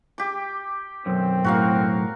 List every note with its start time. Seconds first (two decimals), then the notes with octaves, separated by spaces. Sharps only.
0.18 G4 D6
1.06 B1 F#2 C4
1.44 A2 F#4 A#4 F5